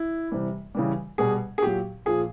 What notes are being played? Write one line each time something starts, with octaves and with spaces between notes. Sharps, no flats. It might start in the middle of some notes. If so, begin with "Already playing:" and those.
Already playing: E4
C3 E3 G3
C#3 E3 G3
B2 G3 G#4
G#4
A#2 F#3 G4
A#2 F3 G#4